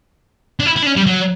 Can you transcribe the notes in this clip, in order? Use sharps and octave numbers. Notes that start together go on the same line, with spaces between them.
D4
E4
E4
D4
C#4
G3
F#3